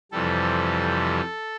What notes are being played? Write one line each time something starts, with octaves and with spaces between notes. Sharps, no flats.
F2 C3 E3 G3 A4